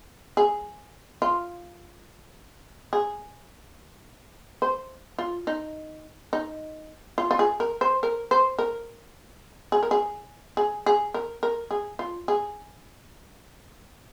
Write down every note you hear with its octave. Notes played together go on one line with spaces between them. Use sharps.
G#4
F4
G#4
C5
F4
D#4
D#4
F4
F4
G#4
A#4
C5
A#4
C5
A#4
G#4
A#4
G#4
G#4
G#4
A#4
A#4
G#4
F4
G#4